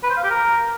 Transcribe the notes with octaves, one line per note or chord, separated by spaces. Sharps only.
B4
C5
F5
G4
A#4